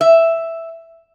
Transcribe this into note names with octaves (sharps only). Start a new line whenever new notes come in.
E5